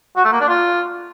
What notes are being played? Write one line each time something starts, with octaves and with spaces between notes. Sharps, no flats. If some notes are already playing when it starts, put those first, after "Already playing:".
F#4
A3
A#3
D4
F4